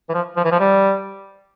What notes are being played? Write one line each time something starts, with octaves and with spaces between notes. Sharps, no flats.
E3
F3
F3
E3
F3
G3